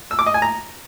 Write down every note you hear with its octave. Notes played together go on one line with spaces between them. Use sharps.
E6
D6
D#5
G#5
A#5